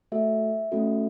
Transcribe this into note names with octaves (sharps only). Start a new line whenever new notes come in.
A3 F#4 A4 E5
A3 C#4 F#4 A4